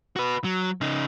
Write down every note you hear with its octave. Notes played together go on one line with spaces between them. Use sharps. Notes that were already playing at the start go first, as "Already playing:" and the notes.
F#4 B4
F#3
C#3 D#4